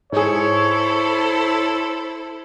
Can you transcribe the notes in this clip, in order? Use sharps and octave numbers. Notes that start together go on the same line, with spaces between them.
G#2 E4 G#4 A4 C5 C#5